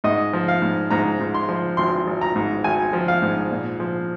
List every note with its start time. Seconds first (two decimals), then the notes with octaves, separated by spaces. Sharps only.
0.04 G#2 D#5
0.33 F3
0.48 F5
0.62 G#2
0.91 G#2 A#5
1.20 G#2
1.34 C6
1.49 F3
1.77 G#1 C6
2.07 G#1
2.21 A#5
2.36 G#2
2.64 G#1 G#5
2.93 F3
3.08 F5
3.22 G#2
3.51 A#2
3.80 F3